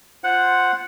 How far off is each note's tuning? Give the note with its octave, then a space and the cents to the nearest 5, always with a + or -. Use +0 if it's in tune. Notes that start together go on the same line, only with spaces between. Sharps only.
F4 +0 C5 +0 F#5 +0